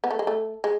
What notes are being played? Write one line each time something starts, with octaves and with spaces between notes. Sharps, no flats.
B3
A3
G#3
A3
G#3